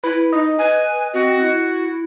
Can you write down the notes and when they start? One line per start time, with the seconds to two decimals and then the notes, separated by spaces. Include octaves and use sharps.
0.04 E4 B4
0.33 D#4 D#5
0.59 B4 G#5
1.14 C4 F#4
1.41 E4